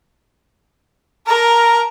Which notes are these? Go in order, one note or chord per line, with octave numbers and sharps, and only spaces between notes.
A#4 A5 A#5